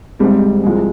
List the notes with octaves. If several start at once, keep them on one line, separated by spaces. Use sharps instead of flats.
G#1 G#2 G3 C4
C2 C3 F3 G#3